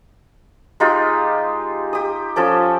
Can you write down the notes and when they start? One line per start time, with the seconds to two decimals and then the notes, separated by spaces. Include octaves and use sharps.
0.80 G#3 D#4 F4 G4
1.93 G4 D#6
2.36 F3 C#4 A4 D6